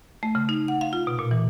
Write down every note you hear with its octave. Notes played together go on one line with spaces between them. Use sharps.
A3
C#3
D#4
F#5
F5
F4
B2
A#2
E3